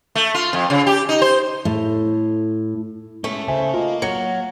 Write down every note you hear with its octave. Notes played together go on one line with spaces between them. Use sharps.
A3
F4
F2
C#3
G4
D#4
C5
A2
G#3 A3 C#4
C#3 C5 E5 G#5
A#3 F4 A#4 D#5
F#3 C#7